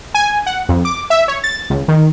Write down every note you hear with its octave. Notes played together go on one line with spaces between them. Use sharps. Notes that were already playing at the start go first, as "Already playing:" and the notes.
G#5
F#5
F2
D6
E5
C#5
A6
C#2
D#3